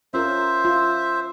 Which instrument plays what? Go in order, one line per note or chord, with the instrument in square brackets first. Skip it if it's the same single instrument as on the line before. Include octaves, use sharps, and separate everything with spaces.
[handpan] C#4 F4 A#4 [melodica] C5 E5
[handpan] F4